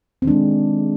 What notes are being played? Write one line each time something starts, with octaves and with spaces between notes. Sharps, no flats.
D#3 G#3 C4 D4